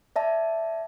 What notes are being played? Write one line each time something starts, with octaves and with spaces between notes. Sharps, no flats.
D5 E5 A5